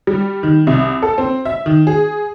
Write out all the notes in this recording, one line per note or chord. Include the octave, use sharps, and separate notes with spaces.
G3
D#3
C2
A4
C4
E5
D#3
G#4